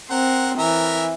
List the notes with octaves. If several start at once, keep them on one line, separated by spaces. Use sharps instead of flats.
C4 A#4 F#5
E3 A#4 E5